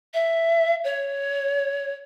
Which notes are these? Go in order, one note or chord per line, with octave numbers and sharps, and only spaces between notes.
E5
C#5